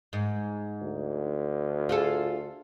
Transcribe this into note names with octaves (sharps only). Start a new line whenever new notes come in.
G#2
D2
F4 G#4 A4